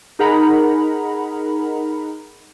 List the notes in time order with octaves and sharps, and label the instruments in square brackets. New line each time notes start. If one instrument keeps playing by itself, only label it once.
[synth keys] D#4 G#4 A#4 F#5 A#5 B5